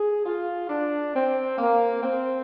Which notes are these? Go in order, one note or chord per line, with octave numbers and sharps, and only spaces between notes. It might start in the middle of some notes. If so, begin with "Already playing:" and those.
Already playing: G#4
F4
D4
C4
A#3
C4